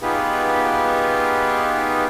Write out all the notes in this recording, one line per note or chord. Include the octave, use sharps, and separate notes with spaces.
B3 D#4 F4 G4 G#4 B4